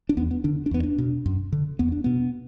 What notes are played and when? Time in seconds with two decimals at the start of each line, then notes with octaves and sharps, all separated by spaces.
0.09 D4
0.17 E2 B3
0.31 B3
0.44 D3 D4
0.66 D4
0.71 E2 B3
0.83 D4
0.98 B2
1.26 F#2
1.52 D3
1.79 E2 B3
1.92 D4
2.04 B2 B3